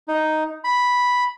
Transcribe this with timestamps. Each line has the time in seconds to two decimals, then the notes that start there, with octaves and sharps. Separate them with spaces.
0.08 D#4
0.64 B5